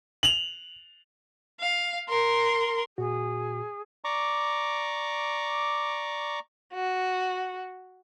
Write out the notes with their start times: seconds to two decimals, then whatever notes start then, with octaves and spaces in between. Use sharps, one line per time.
0.23 F7 F#7
1.60 F5
2.09 A#4 C6
2.98 A#2 F#4 G#4
4.04 D5 A#5 C#6 D6
6.73 F#4